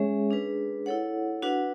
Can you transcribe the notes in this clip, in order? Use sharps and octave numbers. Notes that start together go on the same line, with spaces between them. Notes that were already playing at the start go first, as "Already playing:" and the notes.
Already playing: G#3 C#4 G#4 C#5 E5
D4 G#4 B4
E4 A4 C#5 F#5
D4 F#4 B4 F#5